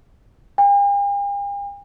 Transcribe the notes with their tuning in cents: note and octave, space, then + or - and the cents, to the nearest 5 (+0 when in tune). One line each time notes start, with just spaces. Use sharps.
G5 +45